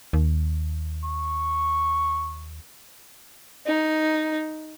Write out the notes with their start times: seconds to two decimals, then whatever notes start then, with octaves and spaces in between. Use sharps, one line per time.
0.13 D#2
1.04 C#6
3.66 D#4